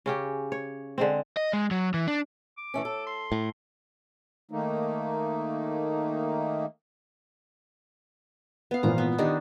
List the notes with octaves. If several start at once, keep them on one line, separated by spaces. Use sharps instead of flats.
C#3 C#4 G4
C#5
D3 G#3 C4
D#5
G#3
F#3
E3
D4
D6
E3 A3 C#4
A4
C6
A2
D#3 A3 A#3 D#4
B3 B4 F5
G#1 A#2 E3 F3 A#5
B3
D#3 D4 D#4 G4